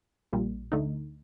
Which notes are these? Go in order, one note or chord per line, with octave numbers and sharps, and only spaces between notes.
A#1 A#2 G3
D2 D3 A3 D#4